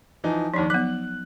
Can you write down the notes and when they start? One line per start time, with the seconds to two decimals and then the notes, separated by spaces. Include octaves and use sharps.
0.24 E3 F3 D#4
0.54 D#2 F3 D4 D#4
0.70 F#3 B3 F#6